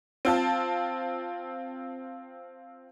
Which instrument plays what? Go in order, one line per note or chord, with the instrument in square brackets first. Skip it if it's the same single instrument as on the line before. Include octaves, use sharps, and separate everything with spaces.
[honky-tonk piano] C4 F4 A5